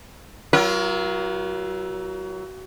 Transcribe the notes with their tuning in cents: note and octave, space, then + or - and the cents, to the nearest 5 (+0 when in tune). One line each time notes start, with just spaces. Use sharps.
F#3 +25 F4 -30 A#4 +35